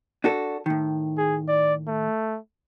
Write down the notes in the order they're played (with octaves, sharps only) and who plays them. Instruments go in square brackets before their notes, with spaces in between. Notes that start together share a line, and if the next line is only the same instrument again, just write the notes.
[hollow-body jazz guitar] D4 F#4 A4
A2 D#3
[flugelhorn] G#4
D5
A3